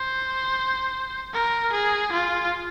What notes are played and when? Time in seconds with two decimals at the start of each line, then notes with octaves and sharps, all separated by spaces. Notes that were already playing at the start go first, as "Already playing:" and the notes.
Already playing: C5
1.34 A#4
1.72 G#4
2.12 F4